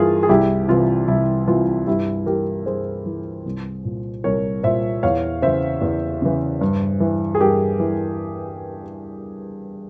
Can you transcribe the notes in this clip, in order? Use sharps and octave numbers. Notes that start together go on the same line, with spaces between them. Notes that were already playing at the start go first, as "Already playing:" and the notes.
Already playing: G2 E3 F4 G#4 A#4
G#4
C2 E4 G4
C3 E3 F4
C2 E4
C3 E3 F4
G2 E4 G4
E3 G4 A#4
G2 G#4 C5
E3
C2
A#2
C2 A#4 C#5
A#2 C5 E5
E2 C#5 F5
C#3 E3 C5 E5
E2
C#3 E3
G2
E3
G#4
G2 G4 A#4
E3